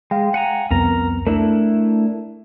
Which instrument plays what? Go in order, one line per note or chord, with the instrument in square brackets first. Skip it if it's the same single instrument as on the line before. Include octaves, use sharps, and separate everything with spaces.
[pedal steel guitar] G#3 [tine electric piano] F5 G5
[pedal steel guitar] F#5 G#5 A#5
[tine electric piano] C2 F2 B3 [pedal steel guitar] A#4 A#5
[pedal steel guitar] A3 D4 E4 [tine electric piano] A#4